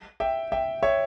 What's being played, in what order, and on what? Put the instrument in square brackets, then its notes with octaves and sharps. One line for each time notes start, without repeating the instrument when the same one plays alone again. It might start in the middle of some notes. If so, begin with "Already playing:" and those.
[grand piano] E5 G5
E5 G5
C#5 E5